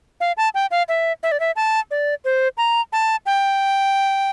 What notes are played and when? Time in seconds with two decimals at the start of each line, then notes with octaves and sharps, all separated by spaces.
0.20 F5
0.37 A5
0.54 G5
0.71 F5
0.89 E5
1.23 E5
1.32 D5
1.40 E5
1.56 A5
1.91 D5
2.25 C5
2.57 A#5
2.93 A5
3.26 G5